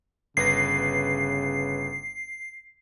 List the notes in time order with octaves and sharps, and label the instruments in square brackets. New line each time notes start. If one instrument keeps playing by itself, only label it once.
[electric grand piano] G1 B4 A#6 [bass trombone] C#3 [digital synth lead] C7